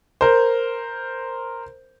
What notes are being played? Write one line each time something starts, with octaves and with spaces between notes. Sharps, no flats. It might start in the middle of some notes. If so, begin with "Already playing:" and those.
A#4 C5